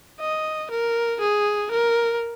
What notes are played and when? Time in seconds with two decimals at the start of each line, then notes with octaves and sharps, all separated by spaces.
0.20 D#5
0.71 A#4
1.21 G#4
1.71 A#4